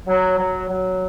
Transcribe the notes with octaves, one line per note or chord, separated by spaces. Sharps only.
F#3
F#3
F#3